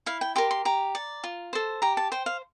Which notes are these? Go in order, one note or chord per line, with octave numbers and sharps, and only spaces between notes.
E4 F5
G5
G4 A#4 C6
C6
G4 A#5
D5
F4
A4 C5
G4 A#5
A5
C5 G5
F5